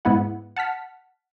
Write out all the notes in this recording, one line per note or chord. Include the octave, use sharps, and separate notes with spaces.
G#2 G#3 B3 E4 F#5
F#5 A5 F6 B6